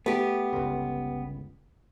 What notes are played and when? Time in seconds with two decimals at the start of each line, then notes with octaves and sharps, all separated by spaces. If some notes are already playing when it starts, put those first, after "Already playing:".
0.06 A3 B3 G4
0.53 G1 C#2